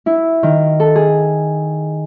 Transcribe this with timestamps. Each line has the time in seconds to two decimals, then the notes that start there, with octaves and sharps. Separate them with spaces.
0.06 E4
0.43 D#3
0.80 A4
0.96 G#4